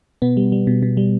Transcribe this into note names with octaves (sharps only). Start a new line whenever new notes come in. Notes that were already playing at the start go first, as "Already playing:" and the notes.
B2 B3
G3
G3
B2
B2
G3